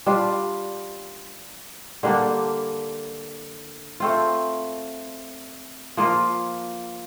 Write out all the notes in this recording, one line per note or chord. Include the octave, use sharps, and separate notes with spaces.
G3 D4 F4
D3 G3 A#3 D4
A3 C4 F4
F3 A#3 F4 A#4